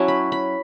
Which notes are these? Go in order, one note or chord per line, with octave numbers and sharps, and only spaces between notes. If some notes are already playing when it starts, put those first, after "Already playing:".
Already playing: F#3 C#4 E4 A5
B5
B5